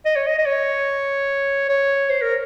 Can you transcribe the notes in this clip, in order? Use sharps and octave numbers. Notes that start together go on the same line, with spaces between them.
D#5
C#5
D#5
D#5
C#5
C#5
C5
A#4